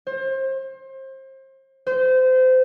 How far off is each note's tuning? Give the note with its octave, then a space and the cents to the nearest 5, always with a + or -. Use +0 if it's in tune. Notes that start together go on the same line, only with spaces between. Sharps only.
C5 +30
C5 -25